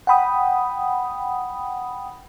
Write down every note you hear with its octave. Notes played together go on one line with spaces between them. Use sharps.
F#5 G5 B5 D#6